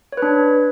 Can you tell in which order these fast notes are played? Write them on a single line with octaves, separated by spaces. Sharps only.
C#5 B4 D4